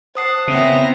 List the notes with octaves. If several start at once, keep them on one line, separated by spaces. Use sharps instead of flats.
C5 F#5 A5 D#6 C7
C#3 B3 C4 E4 A#5